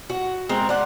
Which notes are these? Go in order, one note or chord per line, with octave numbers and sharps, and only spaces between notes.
F#4
G#3 C4 A#4
D5 F#5